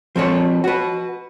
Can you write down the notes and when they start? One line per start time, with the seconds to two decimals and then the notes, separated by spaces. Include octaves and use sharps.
0.16 F3 C4 A4 C#5
0.64 F#4 B4